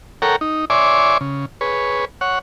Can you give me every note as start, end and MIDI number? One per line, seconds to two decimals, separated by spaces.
0.22 0.36 69
0.22 0.36 70
0.22 0.36 73
0.22 0.36 78
0.22 0.36 79
0.22 0.36 82
0.41 0.65 63
0.70 1.18 73
0.70 1.18 74
0.70 1.18 76
0.70 1.18 80
0.70 1.18 84
0.70 1.18 86
1.21 1.45 49
1.61 2.05 68
1.61 2.05 71
1.61 2.05 73
2.21 2.39 73
2.21 2.39 78